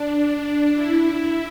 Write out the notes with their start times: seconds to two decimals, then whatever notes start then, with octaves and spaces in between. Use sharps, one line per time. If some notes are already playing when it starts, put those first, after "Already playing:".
Already playing: D4
0.28 D4
0.75 E4